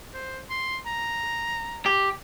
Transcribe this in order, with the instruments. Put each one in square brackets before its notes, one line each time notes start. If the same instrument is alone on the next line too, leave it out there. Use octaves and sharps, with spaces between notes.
[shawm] C5
C6
A#5
[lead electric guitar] G4